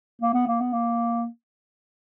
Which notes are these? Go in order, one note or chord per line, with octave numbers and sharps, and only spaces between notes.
A#3
B3
A#3
B3
A#3